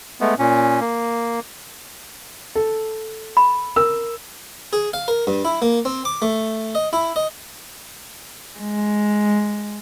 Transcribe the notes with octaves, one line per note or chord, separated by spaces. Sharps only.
G#3 A3 B3
A#2 C#4
A#3
A4
B5
A#4 E6
G#4
F5
A#4
G2
E4
A#3
C4
D6
A3
D#5
E4
D#5
G#3